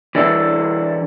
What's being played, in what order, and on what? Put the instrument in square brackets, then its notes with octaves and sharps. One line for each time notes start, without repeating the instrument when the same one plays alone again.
[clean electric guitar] E3 D4 E4 A4